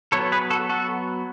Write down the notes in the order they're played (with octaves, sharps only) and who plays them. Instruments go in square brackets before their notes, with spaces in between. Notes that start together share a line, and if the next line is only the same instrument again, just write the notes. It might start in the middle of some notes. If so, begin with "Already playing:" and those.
[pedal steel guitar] F#3 B3 A4 C#5
G#4 B4
F#4 A4
F#4 A4